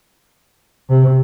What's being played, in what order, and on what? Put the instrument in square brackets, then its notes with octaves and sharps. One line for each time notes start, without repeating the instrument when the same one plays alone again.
[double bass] C3